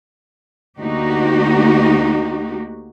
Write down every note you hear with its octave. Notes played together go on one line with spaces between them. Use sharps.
D2 A#3 D#4 F#4 G4